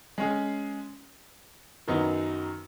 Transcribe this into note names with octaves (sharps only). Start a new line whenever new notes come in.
G#3 C#4 G#4
F#2 D#3 F#3 B3 D#4